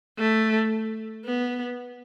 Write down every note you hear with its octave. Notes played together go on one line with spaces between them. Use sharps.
A3
B3